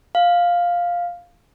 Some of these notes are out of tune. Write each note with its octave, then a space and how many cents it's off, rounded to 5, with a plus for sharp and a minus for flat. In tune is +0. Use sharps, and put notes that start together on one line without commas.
F5 +5